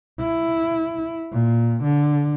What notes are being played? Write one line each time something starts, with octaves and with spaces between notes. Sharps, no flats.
E4
A#2
D3